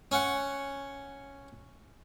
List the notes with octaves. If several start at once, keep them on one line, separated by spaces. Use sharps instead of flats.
C#4 F#5